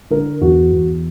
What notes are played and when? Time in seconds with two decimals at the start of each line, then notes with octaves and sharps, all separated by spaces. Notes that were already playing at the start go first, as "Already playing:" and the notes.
0.10 D3 A#4
0.41 E2 F#4
0.72 E2